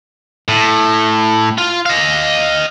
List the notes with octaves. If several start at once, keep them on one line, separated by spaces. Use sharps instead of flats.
A2
F4
D#5 F5